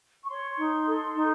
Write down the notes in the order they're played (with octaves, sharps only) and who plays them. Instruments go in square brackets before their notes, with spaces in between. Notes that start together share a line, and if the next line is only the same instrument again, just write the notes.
[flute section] C#6
C#5 C6
D#4
A4
D#4